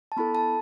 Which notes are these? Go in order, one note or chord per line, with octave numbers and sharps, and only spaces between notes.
A5
B3 E4 A4 B5
A5